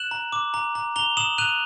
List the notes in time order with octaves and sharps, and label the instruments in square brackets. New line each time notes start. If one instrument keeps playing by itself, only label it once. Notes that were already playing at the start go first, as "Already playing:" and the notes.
Already playing: [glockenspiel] F#6 E7 F#7
A#5
D6
A#5
A#5
A#5 F7 G7
D#6 E7 F#7
F#6 D#7 F7